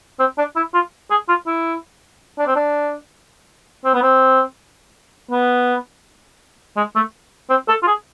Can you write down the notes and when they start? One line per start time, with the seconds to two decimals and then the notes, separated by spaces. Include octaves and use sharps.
0.19 C4
0.38 D4
0.56 E4
0.74 F4
1.11 G#4
1.28 F4
1.47 E4
2.38 D4
2.47 C4
2.56 D4
3.85 C4
3.94 B3
4.03 C4
5.31 B3
6.77 G#3
6.96 A3
7.50 C4
7.68 A4
7.83 F4
7.87 G#4